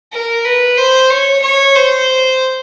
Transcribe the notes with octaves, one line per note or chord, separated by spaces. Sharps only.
A#4
B4
C5
C#5
C#5
C5